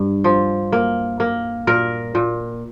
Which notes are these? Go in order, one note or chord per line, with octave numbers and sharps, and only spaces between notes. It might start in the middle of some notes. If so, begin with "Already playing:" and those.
Already playing: G2
F3
A#3
A#3
A#2 A#4
A#2